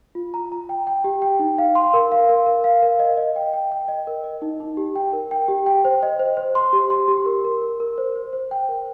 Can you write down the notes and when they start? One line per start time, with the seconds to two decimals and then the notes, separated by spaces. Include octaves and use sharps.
0.15 F4
0.34 A#5
0.52 A#5
0.69 G5
0.87 G5
1.04 G4
1.22 G5
1.39 D#4
1.58 F5
1.75 C6
1.94 A#4
2.12 F5
2.29 A#4
2.46 A#4
2.64 F5
2.82 A#4
2.99 D#5
3.17 D#5
3.36 G5
3.53 G5
3.72 G5
3.88 D#5
4.07 A#4
4.24 D#5
4.42 D#4
4.60 D#4
4.77 G4
4.96 G5
5.13 A#4
5.31 G5
5.48 G4
5.66 G5
5.85 C5
6.03 D#5
6.19 C5
6.37 C5
6.55 C6
6.73 G4
6.90 C6
7.08 G4
7.26 A#4
7.44 A#4
7.62 A#4
7.80 A#4
7.98 C5
8.16 C5
8.33 C5
8.51 G5
8.69 A#4